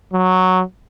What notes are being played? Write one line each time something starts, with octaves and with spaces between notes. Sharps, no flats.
F#3